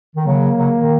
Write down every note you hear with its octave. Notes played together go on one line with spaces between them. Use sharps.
D#3
C#3 F#3 A#3
C#3 F#3
A#2 D#3